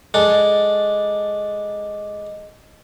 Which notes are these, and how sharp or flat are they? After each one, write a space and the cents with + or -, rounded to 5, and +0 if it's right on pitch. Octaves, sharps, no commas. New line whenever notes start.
G#3 +0 D4 +0 A4 +0